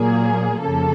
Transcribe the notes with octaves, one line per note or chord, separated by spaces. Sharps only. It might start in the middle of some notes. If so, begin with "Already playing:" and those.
Already playing: A#2 F#3 A#3 G#4
F2 C#3 F3 A#3 A4